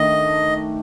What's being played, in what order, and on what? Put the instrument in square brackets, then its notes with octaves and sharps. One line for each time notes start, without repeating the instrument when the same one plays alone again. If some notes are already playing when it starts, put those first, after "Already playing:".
Already playing: [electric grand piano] D#3 A3 D4 [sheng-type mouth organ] D#5